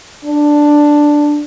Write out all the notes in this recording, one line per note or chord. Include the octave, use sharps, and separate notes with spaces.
D4